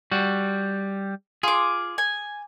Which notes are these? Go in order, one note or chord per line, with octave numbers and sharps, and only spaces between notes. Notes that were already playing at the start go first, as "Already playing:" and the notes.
G3 F#4
F4 G#4 D6
G#5